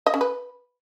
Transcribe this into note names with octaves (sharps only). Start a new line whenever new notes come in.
D#5
C#4
B4